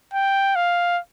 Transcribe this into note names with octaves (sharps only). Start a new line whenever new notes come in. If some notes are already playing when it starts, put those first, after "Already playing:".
G5
F5